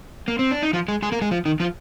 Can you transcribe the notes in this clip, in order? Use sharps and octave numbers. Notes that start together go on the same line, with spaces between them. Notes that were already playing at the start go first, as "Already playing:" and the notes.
A#3
C4
D4
D#4
F3 F4
G#3 G#4
G#3 G#4
A#3 A#4
G#3 G#4
F3 F4
D#3 D#4
F3 F4